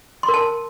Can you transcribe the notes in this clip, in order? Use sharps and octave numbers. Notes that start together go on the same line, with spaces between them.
C6
A#4
A5